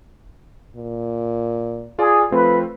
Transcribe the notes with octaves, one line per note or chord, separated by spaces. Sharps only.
A#2
F4 G#4 D5
F3 A3 C4 F4 B4